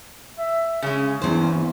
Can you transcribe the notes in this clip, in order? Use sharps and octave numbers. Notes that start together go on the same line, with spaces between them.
E5
C#3 G#3 C#4
E2 G2 C5